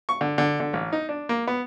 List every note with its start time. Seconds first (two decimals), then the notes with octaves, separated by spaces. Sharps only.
0.09 C#6
0.21 D3
0.38 D3
0.60 D3
0.73 A1
0.93 D#4
1.09 D4
1.29 A#3
1.47 B3